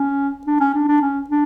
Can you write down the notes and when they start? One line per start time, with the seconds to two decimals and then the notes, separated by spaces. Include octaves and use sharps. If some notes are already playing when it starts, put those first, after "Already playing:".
Already playing: C#4
0.47 D4
0.60 C#4
0.74 D4
0.88 D4
1.02 C#4
1.29 D4